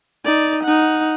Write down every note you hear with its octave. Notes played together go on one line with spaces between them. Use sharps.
D#4 D5
D#4 F#5